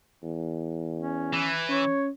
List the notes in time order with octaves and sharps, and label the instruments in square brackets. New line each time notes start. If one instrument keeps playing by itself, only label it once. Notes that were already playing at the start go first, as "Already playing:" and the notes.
[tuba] E2
[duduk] C#4
[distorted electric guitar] E3
[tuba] C#4 [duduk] C#5